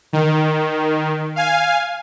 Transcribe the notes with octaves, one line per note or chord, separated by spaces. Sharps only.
D#3
F5 G#5